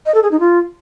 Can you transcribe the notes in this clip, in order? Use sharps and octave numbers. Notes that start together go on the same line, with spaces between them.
D#5
A4
G#4
D#4
F4